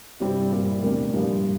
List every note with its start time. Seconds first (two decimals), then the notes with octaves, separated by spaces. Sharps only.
0.20 G2 C3 G3 C4 E4
0.51 A#2 G3 A#3 E4 G4
0.83 E2 A2 C3 G3 A#3 D4
1.13 G2 A#2 F3 A#3 E4